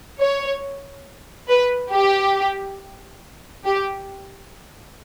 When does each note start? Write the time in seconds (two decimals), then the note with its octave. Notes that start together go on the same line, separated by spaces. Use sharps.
0.20 C#5
1.48 B4
1.92 G4
3.64 G4